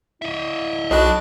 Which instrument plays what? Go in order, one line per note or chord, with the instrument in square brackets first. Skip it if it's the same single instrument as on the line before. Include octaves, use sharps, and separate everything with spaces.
[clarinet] E4 [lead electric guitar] D#5 E5
[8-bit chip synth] B1 F#4 F#6 [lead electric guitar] D4 [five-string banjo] D#5 B5